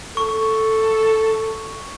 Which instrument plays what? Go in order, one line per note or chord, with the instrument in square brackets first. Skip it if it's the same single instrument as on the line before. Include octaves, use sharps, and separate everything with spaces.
[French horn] A4 [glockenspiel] C#6